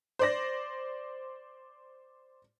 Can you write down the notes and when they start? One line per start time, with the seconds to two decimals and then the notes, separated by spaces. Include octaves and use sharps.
0.19 C5 D5 A#6